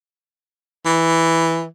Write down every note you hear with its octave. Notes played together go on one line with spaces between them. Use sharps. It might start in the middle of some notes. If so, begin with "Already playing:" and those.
E3